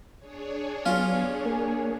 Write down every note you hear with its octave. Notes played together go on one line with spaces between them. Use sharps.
D4 G#4 C#5
F#3 B3 C#4 F4
A#3 A#4 G#5